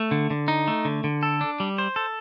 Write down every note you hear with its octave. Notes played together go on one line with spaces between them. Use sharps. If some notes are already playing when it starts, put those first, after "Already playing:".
Already playing: A3
D3
D3
D#4
A3
D3
D3
A4
D4
G3
C5
A4